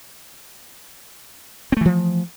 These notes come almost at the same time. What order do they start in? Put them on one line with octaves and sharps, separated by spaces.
C4 A3 E3 F3